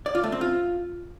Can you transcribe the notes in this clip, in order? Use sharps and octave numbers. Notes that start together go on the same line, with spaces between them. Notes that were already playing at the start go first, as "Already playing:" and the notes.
D5
F4
A3
C4
F4